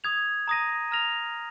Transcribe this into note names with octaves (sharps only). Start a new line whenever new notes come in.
D#6 G#6 F7
A#5 D#6 A#6 D#7
A#5 F6 A#6 F7